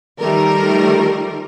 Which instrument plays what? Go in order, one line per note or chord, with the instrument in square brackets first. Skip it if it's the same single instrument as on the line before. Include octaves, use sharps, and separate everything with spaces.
[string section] D#3 F3 G3 A3 A#4